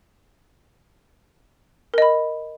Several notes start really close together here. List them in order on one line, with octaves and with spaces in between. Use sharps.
A#4 D#5 B5